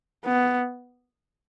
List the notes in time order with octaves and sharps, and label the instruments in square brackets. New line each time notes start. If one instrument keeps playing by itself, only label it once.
[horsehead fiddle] B3